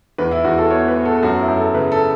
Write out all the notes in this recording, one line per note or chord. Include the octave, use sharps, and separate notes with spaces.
E2 B4
E4
E2 F#4
A4
B3 C#5
B4
B3
A4
A4
F#2 F#4
E4
F#2
A4
C#3 B4
A4